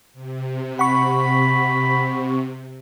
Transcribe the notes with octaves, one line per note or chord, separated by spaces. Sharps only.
C3
F#5 B5 C#6